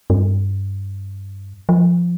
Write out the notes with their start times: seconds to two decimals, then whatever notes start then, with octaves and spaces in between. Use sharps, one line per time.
0.10 G2
1.69 F3